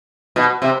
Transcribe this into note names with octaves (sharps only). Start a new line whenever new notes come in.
B2
C3